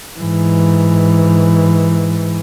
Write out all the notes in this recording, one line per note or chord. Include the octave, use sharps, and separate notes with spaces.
G#2 E3